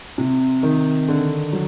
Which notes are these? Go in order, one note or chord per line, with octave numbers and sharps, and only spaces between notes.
C3
D#3
D3
F#3